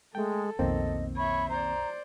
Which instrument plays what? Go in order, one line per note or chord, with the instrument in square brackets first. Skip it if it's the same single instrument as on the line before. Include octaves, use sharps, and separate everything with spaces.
[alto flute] G#3 [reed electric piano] A3 G5 [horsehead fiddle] A4
[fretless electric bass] B1 F2 [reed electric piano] D#3 A#3 C4 [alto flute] D#5
[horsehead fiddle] C#5 E5 [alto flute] B5
[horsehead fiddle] C5 D5 [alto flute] A#5